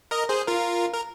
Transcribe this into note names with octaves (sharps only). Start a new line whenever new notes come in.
A#4 D#5
G#4 C5
F4 A#4
A#4